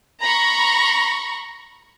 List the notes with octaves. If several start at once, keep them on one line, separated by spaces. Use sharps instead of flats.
A#5 B5 C#6